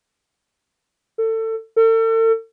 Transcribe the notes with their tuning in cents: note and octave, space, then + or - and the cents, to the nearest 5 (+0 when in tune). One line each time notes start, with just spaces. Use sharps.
A4 +25
A4 +40